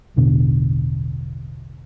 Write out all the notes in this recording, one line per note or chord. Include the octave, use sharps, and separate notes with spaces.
E1 A1 B2 D3